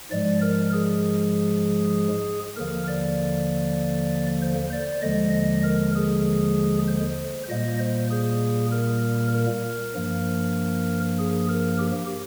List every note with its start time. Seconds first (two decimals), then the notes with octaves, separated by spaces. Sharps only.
0.11 G#2 F3 G#3 D5
0.42 A#4
0.73 G#4
2.57 D#2 D3 F3 A#3 A#4
2.88 D5
4.42 C5
4.73 D5
5.02 D#2 D3 F3 G#3 D#5
5.34 D#5
5.64 A#4
5.96 G#4
6.88 C5
7.49 A#2 G3 A#3 D#5
7.79 C5
8.11 G#4
8.72 A#4
9.34 A#4
9.95 G2 F3 A#3
11.19 G#4
11.49 A#4
11.79 G4